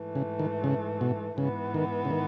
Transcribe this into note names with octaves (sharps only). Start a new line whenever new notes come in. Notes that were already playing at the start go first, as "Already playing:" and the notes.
Already playing: G#2 E3 A3
C#3
D#3
C#3
B2
G#2 C#3 E3 B3
D#3
C#3
D#3